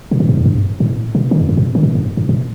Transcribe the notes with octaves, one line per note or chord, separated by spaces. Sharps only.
B2
A2
G2
E2
G2
A2
B2
D3
E2
G2
A2
D3
A2
G2
G2
A2